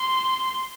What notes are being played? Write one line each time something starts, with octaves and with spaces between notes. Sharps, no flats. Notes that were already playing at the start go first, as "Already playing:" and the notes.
Already playing: C6